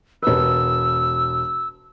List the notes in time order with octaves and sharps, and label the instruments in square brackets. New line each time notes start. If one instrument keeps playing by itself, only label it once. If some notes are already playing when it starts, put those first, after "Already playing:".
[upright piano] E1 B4 [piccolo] E6